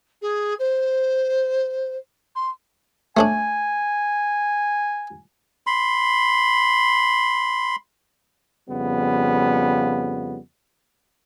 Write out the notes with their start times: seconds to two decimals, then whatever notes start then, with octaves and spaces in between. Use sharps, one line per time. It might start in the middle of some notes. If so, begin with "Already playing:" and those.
0.22 G#4
0.59 C5
2.35 C6
3.17 A3 C#4 D4 G#5
5.67 B5 C6
8.69 F2 C#3 G3 B3